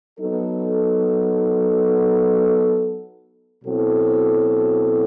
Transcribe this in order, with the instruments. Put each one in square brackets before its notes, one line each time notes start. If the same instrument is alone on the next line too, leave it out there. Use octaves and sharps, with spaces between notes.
[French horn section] F#3 B3 D#4 A4
B2 F#3 C4 E4 A4